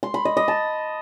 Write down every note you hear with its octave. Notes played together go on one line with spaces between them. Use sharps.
C6
B5
D#5
D#5
A5